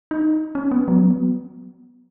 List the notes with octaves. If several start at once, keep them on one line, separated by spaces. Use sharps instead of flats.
D#4
C#4
B3
F#3
B3